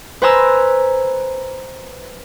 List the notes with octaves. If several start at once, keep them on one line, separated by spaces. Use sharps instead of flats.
B4 C5 G#5 A#5 E6